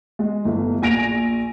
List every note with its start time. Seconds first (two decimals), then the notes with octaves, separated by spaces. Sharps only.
0.19 G#3
0.45 G1 A3 E4
0.82 A#1 G#5 A#6 D7 F7